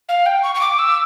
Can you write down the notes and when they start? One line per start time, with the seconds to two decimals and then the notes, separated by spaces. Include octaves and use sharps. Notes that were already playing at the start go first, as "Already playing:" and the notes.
0.09 F5
0.26 G5
0.43 C#6
0.55 C#6
0.61 D6
0.79 E6